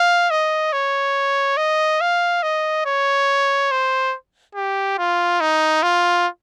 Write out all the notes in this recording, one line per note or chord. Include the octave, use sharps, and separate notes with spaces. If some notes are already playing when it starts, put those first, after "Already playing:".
Already playing: F5
D#5
C#5
D#5
F5
D#5
C#5
C5
G4
F4
D#4
F4